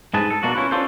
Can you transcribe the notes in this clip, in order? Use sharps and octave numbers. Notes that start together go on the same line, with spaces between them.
G#2 G#4 B4 A5
A4
B2 A#3 D4 F#4
C#4 E4 F4 B4
C#4 D4 F4 A4 B4 C5